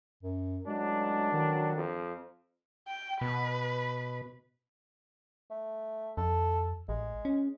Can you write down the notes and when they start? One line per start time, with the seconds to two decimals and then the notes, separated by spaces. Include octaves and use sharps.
0.23 F#2
0.66 A1 F#3 G#3 D4
1.33 D#3
1.76 F2
2.88 G5
3.21 B2 B4
5.51 A3
6.17 F2 A4
6.89 A1 G#3
7.25 C#4